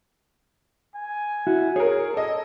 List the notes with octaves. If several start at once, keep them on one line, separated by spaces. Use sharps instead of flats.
G#5
E4 F#4
G#4 A#4 C#5
A4 D#5